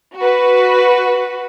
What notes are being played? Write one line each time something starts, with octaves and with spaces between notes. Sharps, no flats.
F#4 B4